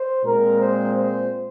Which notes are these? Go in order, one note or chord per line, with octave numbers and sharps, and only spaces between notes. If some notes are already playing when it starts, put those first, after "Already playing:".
Already playing: C5
A#2 G#3 C4 A#4
C5
C5